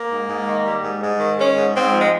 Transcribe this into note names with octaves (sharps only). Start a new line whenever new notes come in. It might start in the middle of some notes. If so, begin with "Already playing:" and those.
Already playing: A#3
G#2
G#2
D#3
G3
G#2
G#2
D#3
G#3 C#4
G#2
G#2 C4
F3
G#3